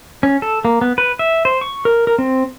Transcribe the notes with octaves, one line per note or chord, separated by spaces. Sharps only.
C#4
A4
A#3
B3
B4
E5
C5
C#6
A#4
A#4
C4